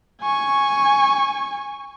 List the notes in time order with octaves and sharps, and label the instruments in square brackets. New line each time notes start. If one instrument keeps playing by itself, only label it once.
[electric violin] G#5 C#6